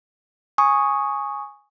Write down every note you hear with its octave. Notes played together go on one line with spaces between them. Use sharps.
G#5 C#6 D#6